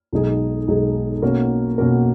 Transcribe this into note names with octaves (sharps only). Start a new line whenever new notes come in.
B1 B2 G#3 D#4 G#4
B1 B2 G#3 D#4 G#4
B2 A#3 C#4 F#4 A#4
B2 A#3 C#4 F#4 A#4